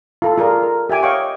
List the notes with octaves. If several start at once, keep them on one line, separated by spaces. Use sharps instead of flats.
F4 A4
F4 G#4 A#4 D5
A#4
G4 E5 G#5 D6
C#5 D#5 F5 G5 C#6 D6